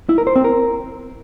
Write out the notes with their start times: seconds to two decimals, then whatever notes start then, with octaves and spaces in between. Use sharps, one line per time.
0.09 E4
0.18 A#4
0.27 C5
0.36 C4
0.44 A#4